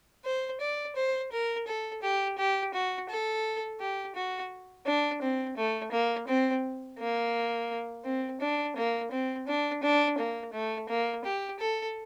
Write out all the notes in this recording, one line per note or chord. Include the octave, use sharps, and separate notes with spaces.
C5
D5
C5
A#4
A4
G4
G4
F#4
A4
G4
F#4
D4
C4
A3
A#3
C4
A#3
C4
D4
A#3
C4
D4
D4
A#3
A3
A#3
G4
A4